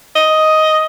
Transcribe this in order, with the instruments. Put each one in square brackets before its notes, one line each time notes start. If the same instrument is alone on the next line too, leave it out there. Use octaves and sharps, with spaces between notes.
[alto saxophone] D#5